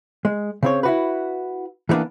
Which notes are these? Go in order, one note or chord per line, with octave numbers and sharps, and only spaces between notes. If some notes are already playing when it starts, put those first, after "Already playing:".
G#3
C#3 C4 C#5
E4 F#4 B4
E3 G3 A#3 B3 D4